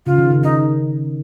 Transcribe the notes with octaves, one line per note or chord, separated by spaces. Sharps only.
C#3 F4
D#3
C#3
D#3 D#4